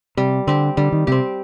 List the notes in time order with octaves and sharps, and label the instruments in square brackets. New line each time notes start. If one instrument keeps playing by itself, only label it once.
[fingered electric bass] C3 [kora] G3
[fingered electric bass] D3 [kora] C4 G4
[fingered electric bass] D3 [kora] G3
[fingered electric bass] D#3
[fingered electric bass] C3 [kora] C4 G4